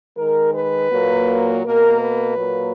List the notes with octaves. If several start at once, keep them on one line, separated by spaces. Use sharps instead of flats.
D#3 G#3 A#4
B4
A#2 F#3 A#3
B2 A#3 A#4
B4
A#2 F#3 A#3